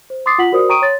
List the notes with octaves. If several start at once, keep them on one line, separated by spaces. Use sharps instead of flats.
C5
C6 D6 D#6 A6 C7
F4 F#5 B6 F#7
F#4 A#4 C5 D5 D#6
G5 A#5 C#6 D#6 D7 D#7
C#5 C6 A6